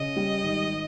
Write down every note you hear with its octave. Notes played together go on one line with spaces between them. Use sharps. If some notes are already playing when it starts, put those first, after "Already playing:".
Already playing: C#3 D#5
G3
G#1